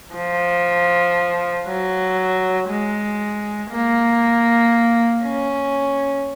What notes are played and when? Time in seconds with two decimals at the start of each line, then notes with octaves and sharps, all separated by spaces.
0.15 F3
1.67 F#3
2.69 G#3
3.70 A#3
5.23 C#4